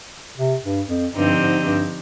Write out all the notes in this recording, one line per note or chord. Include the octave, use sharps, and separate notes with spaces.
C3
G2
F2
G2 D3 F3 C4 D#4 G4
G#2
G2